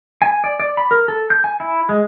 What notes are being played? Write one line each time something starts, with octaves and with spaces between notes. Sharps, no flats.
G#5
D5
D5
B5
A#4
A4
G6
G#5
E4
G#3